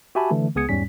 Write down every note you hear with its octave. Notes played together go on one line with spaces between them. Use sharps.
F#4 G4 E5 G#5 A5 B5
D3 E3 A3
C#2 B3 G#4 D#6 G#6 C#7
E2 G#2 G3 C#4 B6